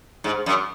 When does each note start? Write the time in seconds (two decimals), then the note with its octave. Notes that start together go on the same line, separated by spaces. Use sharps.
0.24 G#2
0.46 F#2